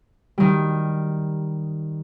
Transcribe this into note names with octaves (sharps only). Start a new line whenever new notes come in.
D#3 G3